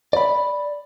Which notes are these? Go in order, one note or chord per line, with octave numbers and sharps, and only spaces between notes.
D5 B5